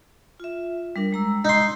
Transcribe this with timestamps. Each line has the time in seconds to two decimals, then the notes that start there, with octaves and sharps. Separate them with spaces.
0.40 F4 E5
0.96 G3 D4 A#4
1.12 G#3 A#5 E6
1.45 D#4 C6